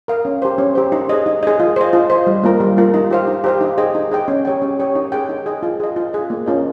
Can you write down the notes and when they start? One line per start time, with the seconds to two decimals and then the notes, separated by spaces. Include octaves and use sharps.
0.08 A#4 F5
0.25 C#4
0.42 G4 C5
0.58 C#4
0.75 G4 C5
0.92 D#4
1.09 G#4 D#5
1.26 D#4
1.43 G#4 D#5
1.60 F4
1.76 C5 D#5
1.93 F4
2.10 C5 D#5
2.27 G3
2.43 A#3 F4 A#4
2.60 G3
2.77 A#3 F4 A#4
2.94 D#4
3.11 G4 C5 F5
3.28 D#4
3.44 G4 C5 F5
3.61 D#4
3.78 G#4 D#5 G5
3.95 D#4
4.11 G#4 D#5 G5
4.28 C#4
4.45 G4 C#5 G5
4.62 C#4
4.79 G4 C#5 G5
4.95 D#4
5.12 G#4 D#5 G5
5.29 D#4
5.46 G#4 D#5 G5
5.63 F4
5.80 G#4 D#5
5.96 F4
6.13 G#4 D#5
6.30 A#3
6.46 C#4 F4 A#4 D#5